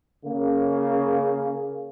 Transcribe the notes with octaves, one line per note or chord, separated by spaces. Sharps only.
C#3 A#3